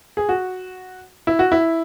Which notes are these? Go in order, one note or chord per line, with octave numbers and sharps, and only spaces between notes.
G#4
F#4
E4
F#4
E4